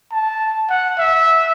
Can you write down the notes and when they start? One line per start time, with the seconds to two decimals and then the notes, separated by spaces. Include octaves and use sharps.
0.11 A5
0.70 F#5
0.98 E5